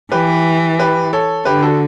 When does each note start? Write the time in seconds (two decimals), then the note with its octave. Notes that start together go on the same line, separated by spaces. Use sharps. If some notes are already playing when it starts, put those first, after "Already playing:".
0.12 E3 G4 B4
0.79 G4 B4
1.13 A4 C#5
1.45 D3 G4 B4
1.62 F#4 A4